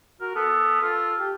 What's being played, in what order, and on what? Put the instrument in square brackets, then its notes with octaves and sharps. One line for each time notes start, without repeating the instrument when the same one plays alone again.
[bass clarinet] F#4 [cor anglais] A#4
[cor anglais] B3 [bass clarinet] A4
[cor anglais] F4 [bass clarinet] A4
[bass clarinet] G4